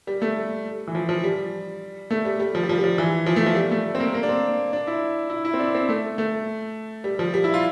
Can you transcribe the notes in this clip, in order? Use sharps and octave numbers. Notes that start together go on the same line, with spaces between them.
G3
A3
E3
F3
F3
G3
A3
G3
G3
F3
G3
F3
G3
F3
E3
F3
A3
F3
G3
A3
C4
A#3
A#3
D4
C4
D4
E4
E4
E4
C4
D4
C4
A3
A3
G3
F3
G3
E4
F4